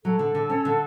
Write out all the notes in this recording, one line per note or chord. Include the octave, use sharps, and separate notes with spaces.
F#3 A4
D3
D3
C#4
D3